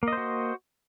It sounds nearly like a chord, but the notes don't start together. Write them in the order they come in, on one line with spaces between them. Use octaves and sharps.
A#3 D#5 C5 F#4